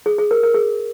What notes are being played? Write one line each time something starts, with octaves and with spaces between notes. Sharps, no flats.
G#4
G#4
A#4
A#4
G#4